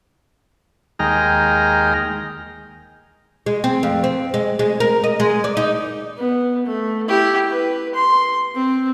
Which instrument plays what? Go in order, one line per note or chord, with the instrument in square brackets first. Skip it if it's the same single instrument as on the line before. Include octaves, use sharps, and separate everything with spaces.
[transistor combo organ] D#2 G#3 D#5 G5 A#5 F6
[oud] G#3
C4
F2
C4
G#3
G#3
A#4
D#5
G#3
D5
D#4
[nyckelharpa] B3
A3
E4 G4
B4
C6
C4